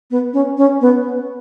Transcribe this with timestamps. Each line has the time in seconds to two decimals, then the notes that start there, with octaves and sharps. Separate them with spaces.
0.11 B3
0.33 C#4
0.58 C#4
0.81 B3